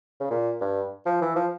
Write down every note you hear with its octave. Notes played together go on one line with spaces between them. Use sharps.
C#3
A#2
G2
F3
E3
F3